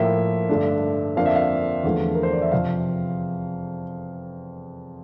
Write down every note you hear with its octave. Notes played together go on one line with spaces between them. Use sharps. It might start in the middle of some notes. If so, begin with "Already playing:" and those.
Already playing: A2 F3 A#3 E5
G2 D3 A3 D4
F2 D3 F3 A#3 D4 F5
E5
F5
E2 D3 F3 A3
A#4
C5
D5
E5
F2 C3 F3 F5